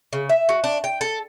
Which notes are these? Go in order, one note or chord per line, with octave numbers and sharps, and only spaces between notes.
C#3
E5
F#4
D4
G5
A4